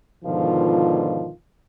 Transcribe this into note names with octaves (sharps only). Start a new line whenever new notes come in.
G#2 B2 D3 D#3 F3 F4